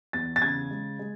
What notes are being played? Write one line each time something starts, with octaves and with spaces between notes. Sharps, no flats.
E2 A6
A6
C#3 G#6
G#3
G#3